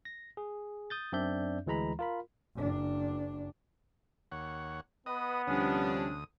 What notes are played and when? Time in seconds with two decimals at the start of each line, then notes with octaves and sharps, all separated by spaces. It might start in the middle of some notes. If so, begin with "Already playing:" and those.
0.05 A#6
0.37 G#4
0.90 D#6 G6 A6
1.12 F#2 C4 D4 D5 E5 G6
1.66 D2 E3 G#3 A#5 B5
1.99 F4 A#4 B5
2.56 F#1 D4
4.32 D#2 C#5 F#5
5.06 B3 B4 D#5 D#6
5.47 D2 C3 F3 G3 C#4 D4 D#6